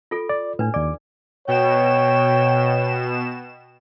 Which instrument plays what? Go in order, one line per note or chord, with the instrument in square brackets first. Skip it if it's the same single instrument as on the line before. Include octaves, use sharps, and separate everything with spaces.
[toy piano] F4 A4
[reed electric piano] D5
[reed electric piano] A2 [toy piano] D4 B4
[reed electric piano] D#2 D6 [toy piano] D5
[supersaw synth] B2 E7 [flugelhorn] C#5 [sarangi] G5